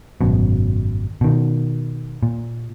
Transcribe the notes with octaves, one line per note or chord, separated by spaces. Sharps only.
G#1 F#2 B2
B2 D#3
A#2